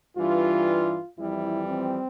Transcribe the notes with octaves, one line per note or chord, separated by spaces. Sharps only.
G2 E3 G3 F4
F2 E3 G3 E4
C4